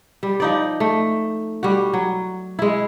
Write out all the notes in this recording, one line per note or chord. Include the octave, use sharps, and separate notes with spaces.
G3
F3 D#4 D5
A3
G3 F#4
F#3
G#3 E4